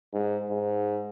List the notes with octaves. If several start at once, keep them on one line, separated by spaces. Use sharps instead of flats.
G#2
G#2